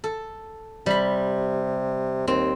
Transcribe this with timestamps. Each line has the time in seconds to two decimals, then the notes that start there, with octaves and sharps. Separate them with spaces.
0.04 A4
0.86 C3 G3 B5
2.28 D#2 C4